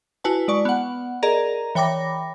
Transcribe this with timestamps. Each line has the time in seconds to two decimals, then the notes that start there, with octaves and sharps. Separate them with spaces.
0.24 E4 F#4 B4 G#5 A5
0.48 G#3 D5 C#6
0.65 B3 F#5
1.23 G#4 A#4 D5 D#5 A#5
1.75 E3 C#5 G5 B5 D6 A#6